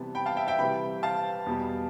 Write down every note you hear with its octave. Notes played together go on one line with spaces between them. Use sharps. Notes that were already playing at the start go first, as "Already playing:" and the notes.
Already playing: C3 E3 G3 B3 A5
G5 B5
F5 A5
E5 G5
E5 G5
C3 E3 G3 G5 B5
F5 A5
E2 B2 G3